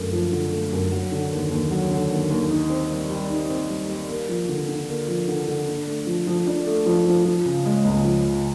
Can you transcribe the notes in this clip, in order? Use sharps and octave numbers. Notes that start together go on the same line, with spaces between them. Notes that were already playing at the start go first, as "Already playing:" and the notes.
Already playing: F#2 D3 A3
F3
D3
A3
F#2
F#3
D3
D#2
D#2
F#3
D3
D#2
D#2
D#4
C4
G3
G3
D#4
C4
G3
G3
A#3
F3
D3
D3
A#3
F3
D3
D3
D4
A3
F3
F3
D4
A3
F3
F3
F3
C#3
G#3
C#2
F3
C#3